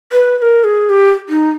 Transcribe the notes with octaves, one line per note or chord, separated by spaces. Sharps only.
B4
B4
A#4
G#4
G4
D#4